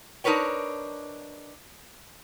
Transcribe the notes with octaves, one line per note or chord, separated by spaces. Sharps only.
D4 D#4 A#4 B4 C#5 G5